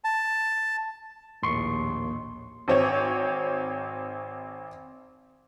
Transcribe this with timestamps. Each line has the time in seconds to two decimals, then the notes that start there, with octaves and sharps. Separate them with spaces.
0.04 A5
1.43 A#1 D#2 A2 C6 C#6
2.68 G#1 C4 C#5